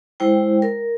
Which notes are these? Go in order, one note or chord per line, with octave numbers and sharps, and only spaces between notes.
G#3 E4 C5 G5
A#4